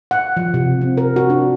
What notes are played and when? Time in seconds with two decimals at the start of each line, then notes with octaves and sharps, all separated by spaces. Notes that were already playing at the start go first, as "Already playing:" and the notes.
0.11 F#5
0.37 F3
0.54 C3
0.81 C4
0.97 A#4
1.16 F#4
1.30 D4